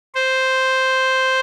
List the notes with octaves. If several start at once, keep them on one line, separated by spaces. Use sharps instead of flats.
C5